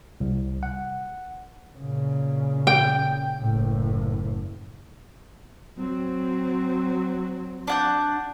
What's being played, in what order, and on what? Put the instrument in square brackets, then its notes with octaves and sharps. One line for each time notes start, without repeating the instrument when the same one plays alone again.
[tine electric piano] C2
F#5
[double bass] A#2 C#3
[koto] G5
[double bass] F#1 A2
F#3 C4
[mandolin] D4 F#5 G6